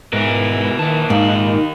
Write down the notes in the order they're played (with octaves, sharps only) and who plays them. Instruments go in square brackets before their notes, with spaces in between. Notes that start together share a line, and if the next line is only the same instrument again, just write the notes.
[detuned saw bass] G#2 [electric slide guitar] B2 A#4 [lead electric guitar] B4 E5
[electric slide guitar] A#2 A5 [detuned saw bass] D#3
[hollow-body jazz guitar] G#2 [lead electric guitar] D#3 F5 [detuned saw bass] D#4